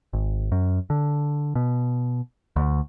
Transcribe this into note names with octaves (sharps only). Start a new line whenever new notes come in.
G#1
F#2
D3
B2
D2